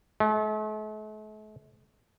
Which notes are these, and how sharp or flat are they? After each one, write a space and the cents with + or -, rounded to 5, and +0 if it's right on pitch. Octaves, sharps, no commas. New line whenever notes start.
A3 -45